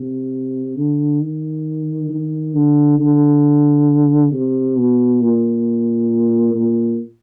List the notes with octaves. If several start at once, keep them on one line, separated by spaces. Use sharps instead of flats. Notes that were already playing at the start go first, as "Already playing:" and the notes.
Already playing: C3
D3
D#3
D#3
D3
D3
C3
B2
A#2
A#2